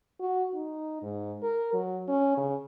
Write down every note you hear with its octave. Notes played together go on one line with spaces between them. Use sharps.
F#4
D#4
G#2
A#4
F#3
C#4
C#3